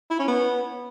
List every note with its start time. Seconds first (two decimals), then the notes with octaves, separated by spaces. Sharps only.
0.10 E4
0.19 C#4
0.28 B3